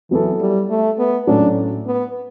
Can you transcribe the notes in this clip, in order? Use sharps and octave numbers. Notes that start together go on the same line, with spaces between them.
E3 F#3 B3 E4 A4
G3
A3
B3
A2 F#3 C#4 D4 F#4 A4
B3